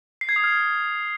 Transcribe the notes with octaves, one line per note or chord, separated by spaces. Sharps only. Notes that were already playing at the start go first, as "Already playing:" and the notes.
C7
G#6
D#6
F6